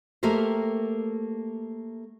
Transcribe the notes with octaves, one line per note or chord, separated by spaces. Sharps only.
A3 A#3 G4 A#4 C5